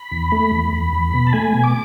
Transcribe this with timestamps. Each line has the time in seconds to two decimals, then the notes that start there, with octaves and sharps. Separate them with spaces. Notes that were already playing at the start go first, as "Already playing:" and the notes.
Already playing: B5
0.11 E2
0.32 A3
0.52 E2
0.73 E2
0.92 E2
1.14 B2
1.27 A5
1.33 A3 G#5
1.54 B2
1.63 D6